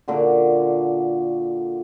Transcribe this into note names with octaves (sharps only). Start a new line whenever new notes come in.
A#2 D3 F#4